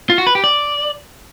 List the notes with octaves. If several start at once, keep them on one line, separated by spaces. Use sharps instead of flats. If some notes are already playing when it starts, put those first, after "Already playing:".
F4
F#4
B4
G4
D5